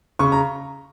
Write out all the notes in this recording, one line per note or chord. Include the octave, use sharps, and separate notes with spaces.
C#3 C#6
A#5